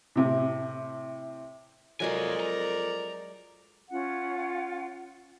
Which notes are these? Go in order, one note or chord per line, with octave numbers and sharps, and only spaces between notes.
A2 C3
F2 F#3 G#3 F4 G#4 A#4 D5 G#5
A#5
C#4 F4 F#5